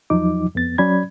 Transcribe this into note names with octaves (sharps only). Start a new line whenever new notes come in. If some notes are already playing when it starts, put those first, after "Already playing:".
E2 F3 F#3 D#4 D6
F2 B3 A6
F#3 C#4 D5 B5 G#6